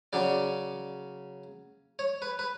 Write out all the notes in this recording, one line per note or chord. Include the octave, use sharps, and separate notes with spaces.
C#3 F#3 C#4 D5
C#5
B4
B4